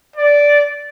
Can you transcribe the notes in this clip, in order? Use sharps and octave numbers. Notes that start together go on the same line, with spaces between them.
D5